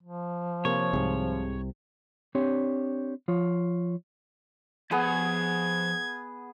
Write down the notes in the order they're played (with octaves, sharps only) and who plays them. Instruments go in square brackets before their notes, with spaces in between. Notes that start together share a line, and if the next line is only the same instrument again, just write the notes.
[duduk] F3
[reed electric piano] C3 A#3 [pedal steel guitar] C#5
[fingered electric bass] C2 C3 [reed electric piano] G#2 G#4
[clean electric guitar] C4 D4 G4 C#5
F3 F4 C#5
[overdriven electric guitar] F3 F#5 [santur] B3 G#4 D#6 [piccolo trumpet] G#6